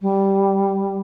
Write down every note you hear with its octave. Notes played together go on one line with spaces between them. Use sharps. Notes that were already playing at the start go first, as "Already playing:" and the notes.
G3